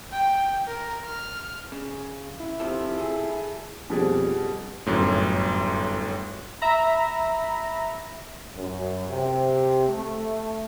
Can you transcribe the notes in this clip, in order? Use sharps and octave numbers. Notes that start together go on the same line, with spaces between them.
G5
A#4
F6
C#3
E4
C3 F3 A4
G#4 A4
A#1 F2 B2 G3 F#4 G#4 D5
G1 F#2 A2
E5 A#5 B5
F#2
C3
A3